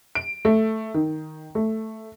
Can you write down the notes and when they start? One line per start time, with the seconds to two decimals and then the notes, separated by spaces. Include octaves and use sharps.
0.15 D7
0.45 A3
0.94 D#3
1.55 A3